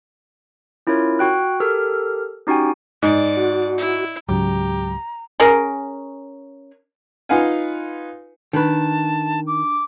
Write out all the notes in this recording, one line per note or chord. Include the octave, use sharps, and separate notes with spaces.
C#4 E4 F4 A#4 C#5
F#4 G5 F#6
G4 A4 A#4 F6
C#4 D#4 F#4 G4 G5 G#5
G#2 D5
F#4
E4
C#2 G#2 C#3 F#3 G4 A#5
C#4 G#4 A#4
D#4 F4 B4 F5 F#5 G#5
D#3 D4 B4 A5
D6